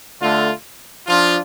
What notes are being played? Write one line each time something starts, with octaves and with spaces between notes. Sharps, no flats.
D3 A3 F4
F3 D4 F4